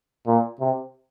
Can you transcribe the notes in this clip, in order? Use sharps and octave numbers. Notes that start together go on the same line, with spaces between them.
A#2
C3